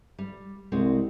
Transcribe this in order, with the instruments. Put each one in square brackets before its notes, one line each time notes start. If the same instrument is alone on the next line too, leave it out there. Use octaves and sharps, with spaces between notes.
[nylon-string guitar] G3
[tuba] C2 [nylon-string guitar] G#3 C4 F#4